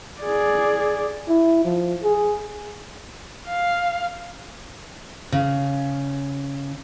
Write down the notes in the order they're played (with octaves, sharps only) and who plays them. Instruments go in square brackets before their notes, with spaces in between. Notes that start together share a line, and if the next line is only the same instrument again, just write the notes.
[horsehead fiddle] G#4 D5
[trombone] E4
F3
G#4
[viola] F5
[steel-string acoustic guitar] C#3